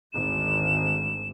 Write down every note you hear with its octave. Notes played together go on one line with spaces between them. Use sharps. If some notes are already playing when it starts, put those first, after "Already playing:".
G#1 D2 E7